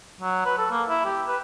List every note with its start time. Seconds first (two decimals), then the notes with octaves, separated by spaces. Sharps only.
0.21 F#3
0.45 B4
0.58 A4
0.71 A#3
0.89 E4
1.06 G4
1.27 B4